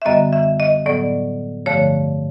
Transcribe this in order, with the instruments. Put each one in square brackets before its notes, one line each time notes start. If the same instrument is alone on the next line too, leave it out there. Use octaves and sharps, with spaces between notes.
[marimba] E5
F#2 D3 G3 B3 D#5
E5
D#5
A2 F#3 B3 D5
G2 D3 F3 A3 C#5